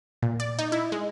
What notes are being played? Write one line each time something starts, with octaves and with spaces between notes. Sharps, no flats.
A#2
D5
D#4
E4
G#3